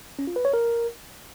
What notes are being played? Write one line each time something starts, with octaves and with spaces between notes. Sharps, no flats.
C#4
F4
B4
C#5
A#4